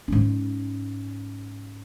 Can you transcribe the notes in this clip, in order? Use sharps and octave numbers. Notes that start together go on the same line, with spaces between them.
G#2 C#4